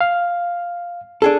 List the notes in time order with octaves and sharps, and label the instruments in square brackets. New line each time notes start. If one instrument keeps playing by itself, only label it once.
[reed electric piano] F5
[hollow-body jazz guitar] D4 G#4 A4